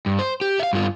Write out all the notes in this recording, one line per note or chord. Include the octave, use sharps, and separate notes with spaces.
G2
C5
G4
E5 F5
G2 F4